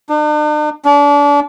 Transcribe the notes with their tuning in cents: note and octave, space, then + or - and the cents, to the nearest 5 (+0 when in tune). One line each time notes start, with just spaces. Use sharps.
D4 +45
D4 -30